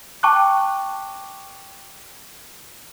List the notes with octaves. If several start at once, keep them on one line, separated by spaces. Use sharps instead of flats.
G5 A5 C#6 D6 F#6